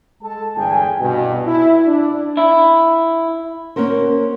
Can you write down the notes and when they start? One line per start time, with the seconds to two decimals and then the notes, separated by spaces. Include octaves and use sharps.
0.22 G#3 A4 A5
0.56 G1 E2 G#4 G5 G#5
0.99 C2 G2 B2
1.46 E4
1.87 D4
2.37 E4
3.76 A#3 C#4 F#4 A#4 C5